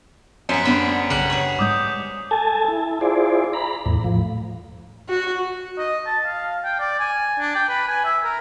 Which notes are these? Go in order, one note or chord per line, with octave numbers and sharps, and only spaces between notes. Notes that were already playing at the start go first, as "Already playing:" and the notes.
F#2 B3 C5 B6 C#7
D3 G3 B3 B5
B1 C#3 G3 F#5
G#4 C#5 D#7
G#2 G3 G#3 D6 D#6 G6
A4 G#5 A5
E4
E4 F4 G#4 C5 D5
A#5 B5
E2 A2
A2 F3
F#4
D#5
A5
F5
G5
D5
G#5
D4
G5
B4
G#5
E5
A#4